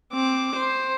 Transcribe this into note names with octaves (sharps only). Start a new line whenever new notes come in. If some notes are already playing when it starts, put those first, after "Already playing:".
C4 D6
C5